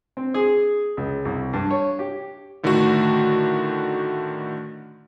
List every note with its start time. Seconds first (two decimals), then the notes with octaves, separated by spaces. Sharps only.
0.17 C4
0.34 G#4
0.97 C#2
1.25 C2
1.53 G2
1.71 C#5
1.99 G4
2.63 A2 D3 D#3 A3 D4 F#4